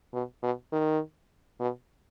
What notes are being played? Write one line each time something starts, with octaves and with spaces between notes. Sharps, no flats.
B2
B2
D#3
B2